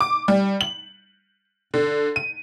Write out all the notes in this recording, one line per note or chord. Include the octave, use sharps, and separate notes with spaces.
D6
G3
F#7
D3
D#7